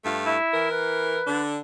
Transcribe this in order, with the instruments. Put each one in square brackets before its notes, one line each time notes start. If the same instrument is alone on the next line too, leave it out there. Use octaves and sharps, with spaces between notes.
[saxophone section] G2 A3 F5
[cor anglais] E4
[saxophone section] E3 A#4
[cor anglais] B4
[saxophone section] D3 D4